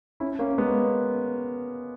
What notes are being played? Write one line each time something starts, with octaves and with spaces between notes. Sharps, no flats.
C#4 E4
A#3 C#4
G#3 B3